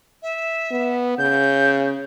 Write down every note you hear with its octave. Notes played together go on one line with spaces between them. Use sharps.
E5
B3
C#3 G6